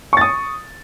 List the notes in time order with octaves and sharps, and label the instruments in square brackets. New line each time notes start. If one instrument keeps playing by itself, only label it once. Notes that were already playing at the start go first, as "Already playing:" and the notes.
[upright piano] C#6
A6
D#6